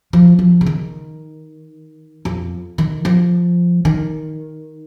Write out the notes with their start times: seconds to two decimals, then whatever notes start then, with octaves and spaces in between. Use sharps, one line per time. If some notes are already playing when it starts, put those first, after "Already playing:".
0.13 F3
0.39 F3
0.61 C#3
0.67 D#3
2.25 F2
2.78 D#3
3.05 F3
3.85 D#3